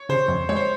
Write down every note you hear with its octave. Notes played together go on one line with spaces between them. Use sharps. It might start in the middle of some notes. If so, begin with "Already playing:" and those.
Already playing: C#5
C#3 C5
F2
G#3 C#5
C5